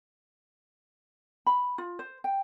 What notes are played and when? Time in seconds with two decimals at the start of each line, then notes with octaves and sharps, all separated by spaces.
1.46 B5
1.78 F4
1.99 C5
2.24 G5